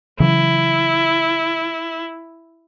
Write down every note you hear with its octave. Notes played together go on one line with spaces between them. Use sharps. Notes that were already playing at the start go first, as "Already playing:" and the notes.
C#3 E3 F#3 E4